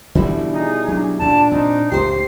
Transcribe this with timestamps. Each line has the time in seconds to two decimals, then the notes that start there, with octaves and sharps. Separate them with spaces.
0.15 B2 D3 E3 G3 A3 E4
0.53 D#4 G#4
0.88 F#3 D4
1.19 D2 G2 A#2 D4 A5
1.51 A#2 C4 D#4
1.92 C#2 A2 G4 C5 C7